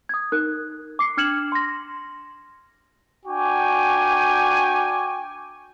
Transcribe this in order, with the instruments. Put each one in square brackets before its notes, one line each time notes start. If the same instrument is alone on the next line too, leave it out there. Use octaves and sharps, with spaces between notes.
[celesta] D#6 G#6
D#4 A#4 F#6
D6 C7 C#7
D4 F6 G#6 C#7 E7 F#7
C6 A#6
[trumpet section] D4 F#4 G5 G#5 C#6 D6